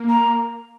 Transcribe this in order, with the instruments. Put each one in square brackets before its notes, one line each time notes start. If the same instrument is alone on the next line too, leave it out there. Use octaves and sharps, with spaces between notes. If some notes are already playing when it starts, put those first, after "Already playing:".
Already playing: [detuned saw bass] A#3
[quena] A#5